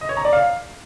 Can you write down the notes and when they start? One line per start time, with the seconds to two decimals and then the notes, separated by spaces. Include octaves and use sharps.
0.01 D#5
0.09 C#5
0.17 A#5
0.25 D5
0.33 F5